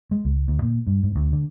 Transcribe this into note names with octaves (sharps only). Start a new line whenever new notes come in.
G#3
C#2
D2
A#2
G2
G#2
D2
D3